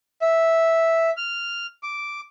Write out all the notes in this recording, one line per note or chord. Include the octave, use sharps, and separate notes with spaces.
E5
F6
D6